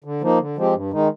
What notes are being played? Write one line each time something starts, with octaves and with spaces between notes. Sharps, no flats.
D3
F3 A#3 D#4
D3
F3 G#3 C4 G4
G2
D#3 G#3 D#4